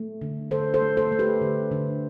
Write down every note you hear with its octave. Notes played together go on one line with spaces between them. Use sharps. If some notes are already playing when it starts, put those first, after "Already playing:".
Already playing: A3
D3
D3 A4 C5
A4 C5
A3
A4 C5
A3
G4 B4
D3
D3